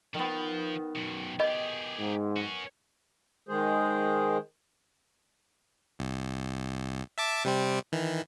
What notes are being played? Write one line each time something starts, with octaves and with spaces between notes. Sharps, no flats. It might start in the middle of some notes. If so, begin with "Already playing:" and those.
D#3 F3 B3
F#2 B2
G4 G#4 D#5
G#2
C#4 F#4
D#3 G#3 G#4 C5
C2
E5 A5 D6
C3 G3 C4
D#3 E3